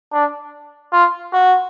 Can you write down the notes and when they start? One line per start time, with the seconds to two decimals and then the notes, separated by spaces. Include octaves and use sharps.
0.13 D4
0.92 F4
1.33 F#4